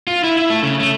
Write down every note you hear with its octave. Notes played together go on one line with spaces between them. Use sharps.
F4
E4
E4
A3
C#3
A3